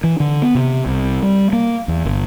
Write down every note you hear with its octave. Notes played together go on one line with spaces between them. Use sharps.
E3
D3
B3
C3
C2
G3
A#3
E2
G1